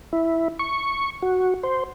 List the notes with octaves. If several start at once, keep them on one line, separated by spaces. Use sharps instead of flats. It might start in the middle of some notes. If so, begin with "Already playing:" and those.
E4
C#6
F#4
C5